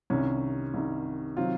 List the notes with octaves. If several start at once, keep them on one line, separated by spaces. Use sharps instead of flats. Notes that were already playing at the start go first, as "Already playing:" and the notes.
C2 C3 D#3 C#4
C2 C3 D#3
C3 D#3 F#3 C4 F4